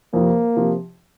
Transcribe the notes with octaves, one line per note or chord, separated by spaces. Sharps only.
F2 C3 F3 A#3
C3 F3